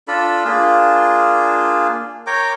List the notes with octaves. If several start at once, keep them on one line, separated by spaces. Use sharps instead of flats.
D4 F4 A4 B5
A#3 D4 F4 G#4
A#4 C#5 G5 D6